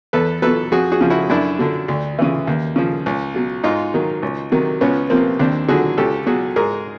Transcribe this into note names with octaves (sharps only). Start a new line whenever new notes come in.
E2 A4 B4
B2 F#3 A4 B4
F2 F#4 G#4
F#4 G#4
C#3 F3
E4 F#4
F#2 D4 E4
D3 F#3
D2
C#3 E3
D#2
C#3 F3
C#2
B2 F#3
G#2 D#4 F4
D#3 F#3
C#2
C3 D#3 F#3
C#2 B3 C#4
C3 F3 A#3 C4
D#2 C4 D4
D3 F#3 F#4 G#4
C#2 G4 A4
B2 F#3 F#4 G#4
G#2 G#4 A#4